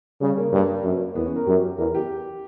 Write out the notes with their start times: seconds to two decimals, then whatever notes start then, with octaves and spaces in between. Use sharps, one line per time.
0.21 C#3 G3
0.37 A#3
0.52 G2
0.84 F#2
1.15 E2 B3
1.26 C#4
1.36 A#4
1.47 F#2 G4
1.78 E2 A#4
1.95 G4